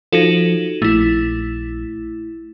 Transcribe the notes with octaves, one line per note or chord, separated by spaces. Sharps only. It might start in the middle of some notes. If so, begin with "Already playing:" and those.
F3 D#4 F#4 A4
A#1 A3 E4